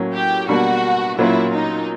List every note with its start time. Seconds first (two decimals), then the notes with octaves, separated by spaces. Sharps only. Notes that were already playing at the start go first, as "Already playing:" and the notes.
Already playing: A2 F#3 A#3 C#4
0.14 G4
0.49 B2 G3 A#3 D4 F#4
1.18 A#2 F#3 A#3 C#4 E4 F4
1.54 D#4